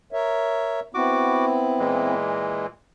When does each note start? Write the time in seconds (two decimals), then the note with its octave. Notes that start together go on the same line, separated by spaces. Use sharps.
0.12 A#4 C#5 E5
0.94 B3 C4 E4 F#4 D6
1.79 A#2 E3 G#3